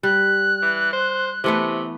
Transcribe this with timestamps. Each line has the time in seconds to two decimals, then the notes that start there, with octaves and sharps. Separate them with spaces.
0.03 G3 F#6
0.63 E3
0.93 C5
1.44 C3 E3 A3 B3